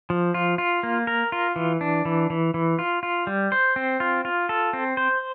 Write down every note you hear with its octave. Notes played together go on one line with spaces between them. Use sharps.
F3
F4
F4
A#3
A#4
F4
E3
D4
E3
E3
E3
F4
F4
G3
C5
C4
F4
F4
A4
C4
C5